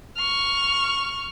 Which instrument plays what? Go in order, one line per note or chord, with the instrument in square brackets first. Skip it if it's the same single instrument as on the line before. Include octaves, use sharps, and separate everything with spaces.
[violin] C#6 F6